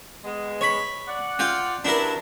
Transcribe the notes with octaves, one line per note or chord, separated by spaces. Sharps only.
G#3 B3
C#5 B5
D5 F#5
F4 F5 G5
G2 F#3 D4 E4 A#4 B4